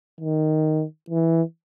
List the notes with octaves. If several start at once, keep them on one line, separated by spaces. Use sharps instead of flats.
D#3
E3